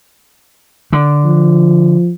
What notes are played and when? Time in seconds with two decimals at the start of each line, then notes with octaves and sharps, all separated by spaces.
0.93 D3
1.25 F3